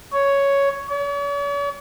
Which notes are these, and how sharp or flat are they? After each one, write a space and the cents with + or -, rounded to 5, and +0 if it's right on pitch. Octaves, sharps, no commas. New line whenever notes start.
C#5 +5
C#5 +45